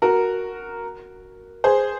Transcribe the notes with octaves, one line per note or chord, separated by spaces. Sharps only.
F#4 A#4
G#4 C5